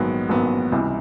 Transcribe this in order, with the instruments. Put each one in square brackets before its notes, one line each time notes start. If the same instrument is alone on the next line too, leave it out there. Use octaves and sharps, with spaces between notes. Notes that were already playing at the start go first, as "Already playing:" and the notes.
Already playing: [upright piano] A#1 G#2 D#3 F#3 B3
A#1 G#2 D#3 F#3 B3
C#2 C3 E3 G3